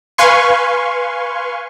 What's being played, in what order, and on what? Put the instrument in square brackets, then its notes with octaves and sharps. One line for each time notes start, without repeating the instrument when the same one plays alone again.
[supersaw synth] B4 F5 G#5 C6 C#6